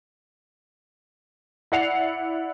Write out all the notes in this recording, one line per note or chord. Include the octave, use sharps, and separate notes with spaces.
E4 D5 F#5 C7 C#7 F7